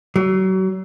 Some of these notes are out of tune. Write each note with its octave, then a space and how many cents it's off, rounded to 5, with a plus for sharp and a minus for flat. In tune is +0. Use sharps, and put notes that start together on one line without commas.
F#3 +35